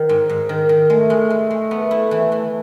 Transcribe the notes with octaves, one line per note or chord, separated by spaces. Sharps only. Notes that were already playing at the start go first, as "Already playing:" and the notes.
Already playing: D#3
G#2
G#2
D#3
D#3
G#3 A3
G#3
G#3
G#3
B3
E4
E3
E3